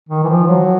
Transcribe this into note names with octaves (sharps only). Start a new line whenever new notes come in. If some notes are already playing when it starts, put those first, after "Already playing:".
D#3
E3
F3
F#3